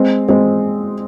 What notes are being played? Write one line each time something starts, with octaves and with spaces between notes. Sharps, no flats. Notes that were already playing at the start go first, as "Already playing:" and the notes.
Already playing: G#3 C4
G#3 C4